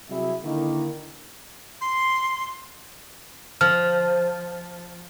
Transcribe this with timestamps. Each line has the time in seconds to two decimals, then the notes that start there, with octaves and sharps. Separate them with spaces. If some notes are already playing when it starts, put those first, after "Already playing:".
0.10 C3 F#3 G3 E4 G#4 E5
0.44 D3 D#3 A#3 E4
1.80 C6
3.61 F3 F6